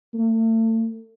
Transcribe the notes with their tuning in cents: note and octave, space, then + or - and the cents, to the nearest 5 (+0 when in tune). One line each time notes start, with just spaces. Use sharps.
A3 +35